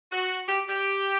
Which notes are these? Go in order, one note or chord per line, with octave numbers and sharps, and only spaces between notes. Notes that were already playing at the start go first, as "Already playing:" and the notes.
F#4
G4
G4